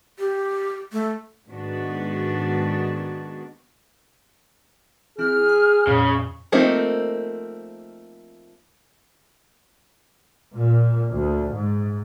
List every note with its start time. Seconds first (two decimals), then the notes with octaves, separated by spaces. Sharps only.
0.19 G4
0.92 A3
1.48 G#2 D#3 B3 D4 F#4
5.18 E3 C4 E4 G#4 F6
5.49 B5
5.87 F2 A#2 C#3
6.52 F3 A3 A#3 C4 D#4
10.54 A#2
11.09 D2
11.52 G#2